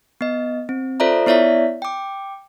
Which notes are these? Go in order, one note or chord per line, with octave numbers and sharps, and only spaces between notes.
B3 D#5
C4
F4 A4 C5 D5 E5 A#5
B3 E4 C#5 D5 E5 B6
G5 D6